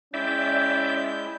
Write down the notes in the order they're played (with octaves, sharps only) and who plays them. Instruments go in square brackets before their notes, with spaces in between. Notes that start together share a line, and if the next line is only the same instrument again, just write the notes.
[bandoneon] G#3 E4 G6 [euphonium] C#4 [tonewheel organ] D5 E5 [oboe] G5